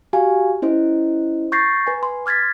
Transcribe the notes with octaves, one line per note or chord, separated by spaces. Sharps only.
F#4 G4 F5 G#5
C#4 E4 C5 D#5
C#6 G6 A6 A#6 C7
B4 G#5
C6
D6 F6 G#6 A6 B6